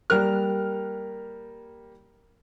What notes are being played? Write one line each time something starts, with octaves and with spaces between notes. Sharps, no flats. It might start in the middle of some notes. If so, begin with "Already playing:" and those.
G3 A#3 A#4 F6